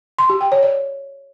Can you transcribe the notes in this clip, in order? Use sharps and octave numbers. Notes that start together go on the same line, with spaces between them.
C6
G4
G5
C#5
D5